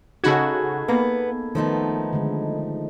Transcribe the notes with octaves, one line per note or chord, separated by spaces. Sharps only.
C#3 D#4 F#4 G#4 A4 F#5 B5 G#6
A#3 B3
D#3 F3 A3 B3 D#4
D3 D#3 G#3